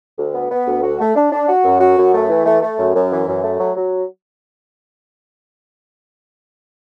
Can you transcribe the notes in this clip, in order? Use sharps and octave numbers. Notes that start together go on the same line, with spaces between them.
D2
B3
B3
D2
F#4
A3
D4
D4
F#4
F#2
F#4
F#2
A3
E3
A3
A3
F#2
F#2
E3
F#2
A3
F#3
F#3